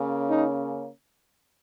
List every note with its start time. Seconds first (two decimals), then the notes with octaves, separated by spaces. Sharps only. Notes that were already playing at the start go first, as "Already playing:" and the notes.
Already playing: C#3 A#3 C#4
0.29 D#4